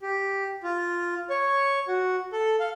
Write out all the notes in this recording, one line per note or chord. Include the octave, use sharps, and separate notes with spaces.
G4
F4
C#5
F#4
A4
F5